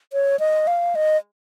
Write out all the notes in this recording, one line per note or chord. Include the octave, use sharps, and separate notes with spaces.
C#5
D#5
F5
D#5